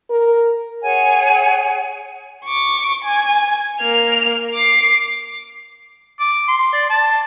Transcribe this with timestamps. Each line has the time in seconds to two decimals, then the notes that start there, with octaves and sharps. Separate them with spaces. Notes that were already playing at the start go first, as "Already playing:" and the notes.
0.10 A#4
0.82 G#4 C#5 F#5 G#5
2.45 C#6 D6
3.04 G#5
3.80 A#3 F6
4.54 D6 C7
6.20 D6
6.48 C6
6.73 D5
6.90 A5